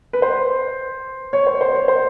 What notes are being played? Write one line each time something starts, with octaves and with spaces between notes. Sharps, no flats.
B4
C5
C#5
C5
C5
C#5
C5